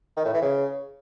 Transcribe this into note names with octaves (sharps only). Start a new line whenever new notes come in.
D#3
A2
E3
C#3